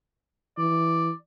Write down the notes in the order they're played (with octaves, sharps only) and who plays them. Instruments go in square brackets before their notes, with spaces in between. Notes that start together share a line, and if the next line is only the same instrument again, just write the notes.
[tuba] E3 [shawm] D5